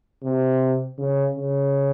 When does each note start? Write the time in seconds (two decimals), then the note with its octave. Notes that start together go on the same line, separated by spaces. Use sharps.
0.23 C3
0.98 C#3
1.36 C#3